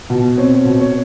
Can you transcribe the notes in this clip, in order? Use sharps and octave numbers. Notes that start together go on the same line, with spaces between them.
B2
C4 C#5
B2
C#5